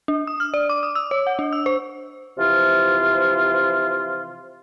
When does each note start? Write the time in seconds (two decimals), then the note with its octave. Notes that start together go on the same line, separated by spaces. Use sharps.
0.08 D4
0.27 D#6
0.40 F6
0.54 D5
0.69 D6
0.83 D#6
0.95 E6
1.11 C#5
1.27 F#5
1.39 D4
1.53 E6
1.66 C5
2.37 C3 E3 F3 F4